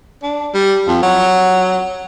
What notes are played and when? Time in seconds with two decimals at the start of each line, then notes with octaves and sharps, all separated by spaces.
0.23 D4
0.54 G3
0.88 F2
1.03 F#3